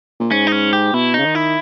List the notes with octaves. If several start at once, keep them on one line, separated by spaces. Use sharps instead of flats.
A#2
G#2 C#4
D#4
C#4
G4
B2 E4
D#4
C#3
D#3
E4